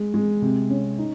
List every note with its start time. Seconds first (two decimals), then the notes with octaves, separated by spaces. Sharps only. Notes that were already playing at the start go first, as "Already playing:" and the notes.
Already playing: G#3
0.14 G#3
0.42 C3
0.70 C#4
0.98 D#4